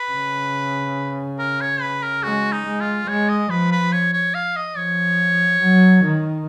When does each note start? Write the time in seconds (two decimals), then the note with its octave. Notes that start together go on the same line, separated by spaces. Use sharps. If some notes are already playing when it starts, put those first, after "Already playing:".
Already playing: B4
0.12 C#3
1.39 A#4
1.61 C#5
1.81 B4
2.03 A#4
2.23 G#3 F#4
2.52 D#4
2.66 G#3
2.80 F4
3.08 G#3 C#5
3.29 D#5
3.50 F3 B4
3.72 B4
3.92 C#5
4.13 C#5
4.34 F5
4.56 D#5
4.77 F3 C#5
5.62 F#3
6.04 D#3